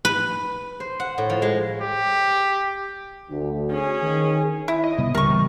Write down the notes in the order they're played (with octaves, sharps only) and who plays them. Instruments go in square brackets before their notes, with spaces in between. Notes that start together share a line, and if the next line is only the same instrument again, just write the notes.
[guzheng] B4
C5
F#5
A2
F3
G#3
[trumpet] G4
[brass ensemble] D2
[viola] C#4 G#4
[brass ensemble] D#3
[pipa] E4
[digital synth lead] D#5
[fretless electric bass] C3 G3 B3
[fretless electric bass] D1 C#3 [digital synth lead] G3 [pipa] A#4 C#6
[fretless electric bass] C#3 E3 A#3